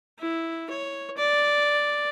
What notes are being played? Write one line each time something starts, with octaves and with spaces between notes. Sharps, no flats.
E4
C#5
D5